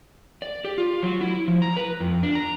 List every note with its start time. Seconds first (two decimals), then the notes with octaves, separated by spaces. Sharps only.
0.42 D5
0.64 G4
0.78 F4
1.03 F#3
1.21 E4
1.48 F3
1.62 A#5
1.77 B4
2.00 F2
2.23 D4
2.35 A#5